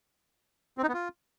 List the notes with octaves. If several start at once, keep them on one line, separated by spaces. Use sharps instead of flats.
C4
D#4
B3
F4